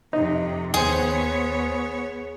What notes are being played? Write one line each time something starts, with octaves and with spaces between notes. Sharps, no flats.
F2 C3 D#4
D#2 B3 G#4 C5 C#5